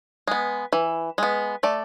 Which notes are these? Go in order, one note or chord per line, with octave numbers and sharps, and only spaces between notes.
G#3 B3
E3
G#3 B3
A3 D5